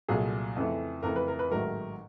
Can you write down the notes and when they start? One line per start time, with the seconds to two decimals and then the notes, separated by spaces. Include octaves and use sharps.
0.08 C2 A#2 F#3 A3 G#4
0.56 F2 C#3 E3 A3
1.03 F2 C#3 E3 A3 A#4
1.16 B4
1.28 A#4
1.39 B4
1.49 A1 G#2 D#3 F#3 A3 A#4